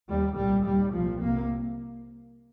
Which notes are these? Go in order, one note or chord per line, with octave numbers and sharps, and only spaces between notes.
D#2 G3
C2 A#2 G3
D#2 G3
C2 A#2 F3
C2 C3 A#3